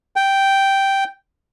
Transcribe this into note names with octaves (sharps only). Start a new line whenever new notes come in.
G5